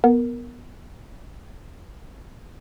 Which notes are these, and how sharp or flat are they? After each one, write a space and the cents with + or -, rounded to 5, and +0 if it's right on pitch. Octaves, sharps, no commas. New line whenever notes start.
B3 -15 A#4 +0